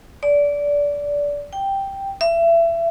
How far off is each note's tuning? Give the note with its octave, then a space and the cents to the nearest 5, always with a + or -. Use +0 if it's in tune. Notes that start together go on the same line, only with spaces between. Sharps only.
D5 -20
G5 +0
E5 +30